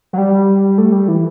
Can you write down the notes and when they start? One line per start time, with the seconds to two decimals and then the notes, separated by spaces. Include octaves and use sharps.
0.13 F#3
0.18 G3
0.78 A3
0.92 G3
1.08 E3